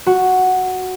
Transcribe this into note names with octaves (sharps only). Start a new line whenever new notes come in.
F#4